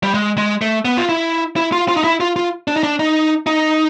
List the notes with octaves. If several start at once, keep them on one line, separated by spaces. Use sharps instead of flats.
G3
G#3
G#3
A3
B3
F4
E4
E4
F4
F4
D#4
E4
F4
F4
D4
D#4
D4
D#4
D#4